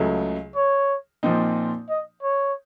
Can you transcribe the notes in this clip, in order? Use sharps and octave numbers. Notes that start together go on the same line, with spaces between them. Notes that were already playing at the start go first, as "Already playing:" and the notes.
Already playing: C#2 C#3 F#3 A3
C#5
A#2 F3 C4 D#4
D#5
C#5